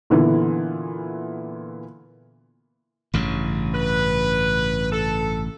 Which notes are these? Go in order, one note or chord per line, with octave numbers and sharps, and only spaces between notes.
A#2 D3 E3 B3
A1 G2 C#3
B4
A4